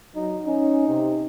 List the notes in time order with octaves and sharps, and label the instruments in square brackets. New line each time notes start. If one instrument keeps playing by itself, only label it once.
[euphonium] F#3 [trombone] D#4
[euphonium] C#4 [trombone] D#4
[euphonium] C3